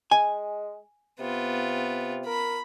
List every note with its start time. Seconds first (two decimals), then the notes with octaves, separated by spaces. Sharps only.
0.11 G#3 G#5
1.20 C3 B3 F4
2.26 A#4 B5